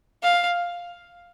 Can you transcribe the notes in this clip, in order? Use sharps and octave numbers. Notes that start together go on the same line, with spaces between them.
F5